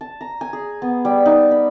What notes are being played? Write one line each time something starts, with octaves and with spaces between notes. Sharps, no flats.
A5
A#5
G#5
G#4
B3
G3
D#4
B5